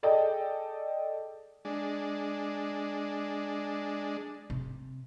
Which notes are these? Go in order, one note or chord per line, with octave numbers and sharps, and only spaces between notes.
G#4 A4 D5 D#5 G5
G#3 D4
C3